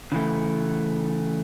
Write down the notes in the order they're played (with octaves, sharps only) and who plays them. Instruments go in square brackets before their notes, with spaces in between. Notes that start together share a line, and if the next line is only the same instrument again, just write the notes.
[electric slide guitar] C#3 E3 A3